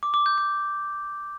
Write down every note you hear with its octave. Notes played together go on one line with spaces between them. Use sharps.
D6
D6
G6
D6